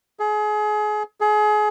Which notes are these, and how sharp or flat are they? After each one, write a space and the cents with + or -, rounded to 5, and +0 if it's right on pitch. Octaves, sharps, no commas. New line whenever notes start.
G#4 +30
G#4 +30